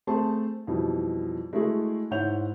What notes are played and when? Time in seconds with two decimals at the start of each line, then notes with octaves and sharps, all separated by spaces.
0.07 A3 C4 G#4 A5 C6
0.67 F2 B2 E3 G3 D#4
1.53 G#3 A3 E4 F#4 G#4 A4
2.11 G#2 E4 C#5 F#5 G6 F7